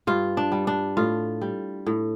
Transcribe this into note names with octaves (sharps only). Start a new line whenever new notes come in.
G2 F4
D4
G3
D4
A2 F4
G3
A2